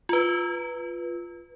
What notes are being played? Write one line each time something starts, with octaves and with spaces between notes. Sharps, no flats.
F4 B4